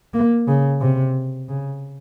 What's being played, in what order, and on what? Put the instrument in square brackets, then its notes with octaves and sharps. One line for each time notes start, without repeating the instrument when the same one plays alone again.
[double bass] A#3
C#3
C3
C#3